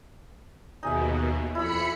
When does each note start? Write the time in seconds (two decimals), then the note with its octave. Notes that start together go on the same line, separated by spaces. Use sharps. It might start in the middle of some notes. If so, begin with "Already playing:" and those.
0.83 D#2 B2 D#4 G#4 E5
1.55 F2 E4 B5 E6 C#7